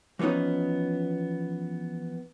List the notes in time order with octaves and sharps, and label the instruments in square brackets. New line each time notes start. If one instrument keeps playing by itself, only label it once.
[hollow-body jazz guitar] E3 F3 B3 C#4 D#4